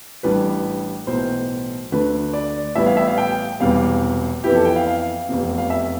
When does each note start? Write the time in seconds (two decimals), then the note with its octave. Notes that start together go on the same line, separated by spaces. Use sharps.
0.23 A1 A2 E3 G3 D4 B4
1.07 B1 A2 E3 C5
1.92 D2 D3 A3 D4 B4
2.33 D5
2.75 A1 A2 G3 B3 E4 E5
2.86 F5
2.97 E5
3.08 F5
3.18 G5
3.60 E1 E2 C3 G3 F5
4.44 F2 E3 B3 E4 G4
4.55 A4
4.65 G5
4.76 F5
4.87 F5
5.29 F1 E2 C3
5.58 F5
5.70 E5